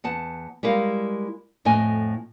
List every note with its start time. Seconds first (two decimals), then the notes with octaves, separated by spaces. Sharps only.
0.04 E2 F#5 A5
0.63 G3 G#3 E4 A#4 F5
1.65 F2 A2 D#5 G#5